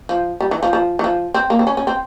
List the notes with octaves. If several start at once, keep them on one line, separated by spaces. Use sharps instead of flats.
F3
G3
E3
F3
F3
E3
F3
C4
A#3
C4
C#4
C#4
C4